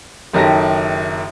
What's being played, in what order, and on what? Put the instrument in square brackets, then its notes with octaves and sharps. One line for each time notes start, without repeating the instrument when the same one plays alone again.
[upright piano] F#1 F#2 D#3 G4 A4 A#6